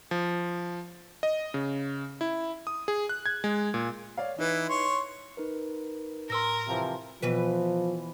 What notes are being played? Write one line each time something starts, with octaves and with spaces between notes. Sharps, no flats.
F3
D#5
C#3
E4
D#6
G#4
F#6
G#6
G#3
A#2
C#5 D5 F5
E3 D#4 E4 B4
C#5 C6
D#4 A#4 B4
A2 A#4 C6 E6 A#6
C3 E3 F3
B2 E3 F3 B4